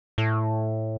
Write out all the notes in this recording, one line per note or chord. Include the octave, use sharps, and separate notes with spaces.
A2